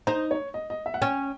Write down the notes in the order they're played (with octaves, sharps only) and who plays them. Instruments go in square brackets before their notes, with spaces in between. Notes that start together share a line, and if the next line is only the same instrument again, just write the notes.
[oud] D#4 [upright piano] C5
[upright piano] C#5
D#5
D#5
E5
F#5
[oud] C#4 [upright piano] G5